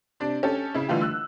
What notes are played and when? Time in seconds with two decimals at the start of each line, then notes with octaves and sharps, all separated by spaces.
0.20 C3 D4
0.43 C#4 G4 A4
0.74 C#3 E4
0.88 D3 E3 G3 A3 F4 G4
1.01 E6 F#6